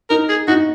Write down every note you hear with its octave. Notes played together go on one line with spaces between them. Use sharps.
D#4 A#4
G#4
D#4 F#4